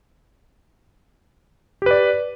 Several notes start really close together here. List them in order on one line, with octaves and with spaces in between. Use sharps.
G4 B4 D5